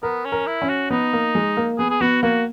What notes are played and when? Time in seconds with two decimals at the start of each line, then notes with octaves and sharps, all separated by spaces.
0.02 B3 A#4
0.25 C#4
0.32 A#4
0.46 E4
0.62 C#4
0.69 F#4
0.90 B3 D#4
1.13 A#3
1.35 G#3
1.57 A#3
1.78 B3 G#4
1.90 G#4
2.01 B3 F#4
2.23 A#3 F#4